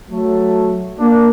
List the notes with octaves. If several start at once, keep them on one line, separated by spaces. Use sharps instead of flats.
F#3 A3
A#3 D4